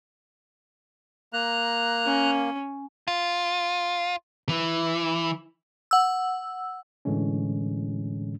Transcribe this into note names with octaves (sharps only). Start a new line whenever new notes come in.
A#3 A#5 F#6
C#4
F4
E3
F#5 E6
A2 D3 E3 G#3 C#4